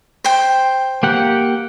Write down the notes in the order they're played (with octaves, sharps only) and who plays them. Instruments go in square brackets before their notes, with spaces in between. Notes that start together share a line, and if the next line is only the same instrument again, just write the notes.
[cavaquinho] C5 G5
[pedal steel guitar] A#3 G4 F#5